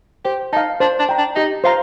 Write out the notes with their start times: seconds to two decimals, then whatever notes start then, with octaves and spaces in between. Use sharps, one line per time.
0.25 G4 C5
0.52 D#4 F5 A5
0.80 D4 C5
0.99 D4
1.09 G5 A#5
1.18 D4
1.36 D#4 G4
1.64 F4 C5 F5 A#5